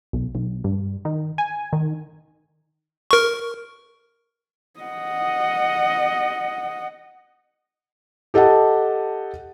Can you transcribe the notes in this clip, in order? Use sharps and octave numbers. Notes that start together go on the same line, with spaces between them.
B1
B1
G2
D#3
G#5
D#3
A#4 C#6
D#5 F#5
G4 A4 D#5 F#5 A5